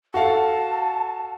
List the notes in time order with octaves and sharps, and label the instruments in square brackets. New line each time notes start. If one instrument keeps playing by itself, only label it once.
[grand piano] F#4 A4 F5 [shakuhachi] A5